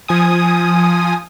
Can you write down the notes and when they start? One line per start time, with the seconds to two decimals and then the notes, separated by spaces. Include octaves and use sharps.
0.08 F3 G#5 D#6